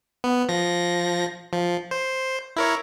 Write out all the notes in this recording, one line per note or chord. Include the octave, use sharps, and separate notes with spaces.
B3
F3 A#6
F3
C5
E4 A#4 C#5